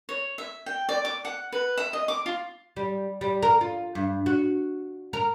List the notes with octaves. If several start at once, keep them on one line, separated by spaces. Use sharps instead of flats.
C#5
E5
G5
D5
D6
F#5
B4
E5
D#5
D6
F4
G3
G3
A#4
F4
G2
F#4
A#4